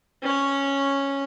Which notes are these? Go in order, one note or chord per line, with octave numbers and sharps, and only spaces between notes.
C#4 C#5